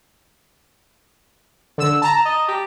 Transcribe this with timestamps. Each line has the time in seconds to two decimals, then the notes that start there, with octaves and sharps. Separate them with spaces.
1.78 D3 E6
2.02 A5 A#5
2.25 D#5
2.48 G4